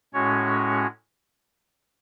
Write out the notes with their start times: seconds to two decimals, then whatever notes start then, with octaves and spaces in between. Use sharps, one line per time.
0.13 A2 G#3 C#4 F#4 C#5